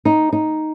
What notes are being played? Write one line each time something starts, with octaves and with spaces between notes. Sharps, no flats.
D#4
D#4